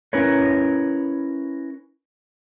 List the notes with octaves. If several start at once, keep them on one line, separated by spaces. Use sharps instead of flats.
C#4 E4 A#4 B4 C#5